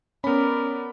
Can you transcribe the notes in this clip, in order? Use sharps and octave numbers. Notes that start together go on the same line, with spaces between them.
B3 C#4 A#4 D5 B5